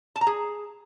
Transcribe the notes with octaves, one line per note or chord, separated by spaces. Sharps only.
A5
A#5
G#4